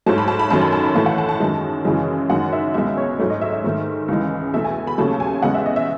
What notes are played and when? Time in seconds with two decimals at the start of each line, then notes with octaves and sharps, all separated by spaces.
0.06 G#2 F#3 A3 A5
0.18 B5
0.28 A5
0.39 B5
0.50 F#2 D#3 F#3 A3 A5
0.61 B5
0.73 A5
0.84 B5
0.95 A2 E3 A3 A5
1.06 F#5
1.18 A5
1.29 A5
1.40 F#2 D#3 G#3
1.85 F#2 C#3 E3 G#3
2.30 F#2 D#3 G#3 F#5
2.53 E5
2.74 C#2 B2 G#3 E5
2.97 C#5
3.19 G#2 F#3 A3 C#5
3.30 D#5
3.41 E5
3.53 E5
3.64 G#2 D#3 A3
4.08 C#2 C#3 E3 G#3
4.54 E2 B2 A3 E5
4.64 G#5
4.87 B5
4.98 D#2 C#3 F#3 A3 A5
5.20 G#5
5.42 E2 C#3 G#3 F#5
5.54 E5
5.66 D#5
5.76 E5